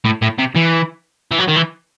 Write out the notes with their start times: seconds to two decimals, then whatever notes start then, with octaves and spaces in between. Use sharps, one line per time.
0.05 A2
0.22 A2
0.38 C3
0.55 E3
1.31 E3
1.38 F#3
1.48 D#3
1.56 E3